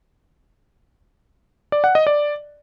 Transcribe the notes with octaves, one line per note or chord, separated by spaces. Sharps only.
D5
F#5
D#5
D5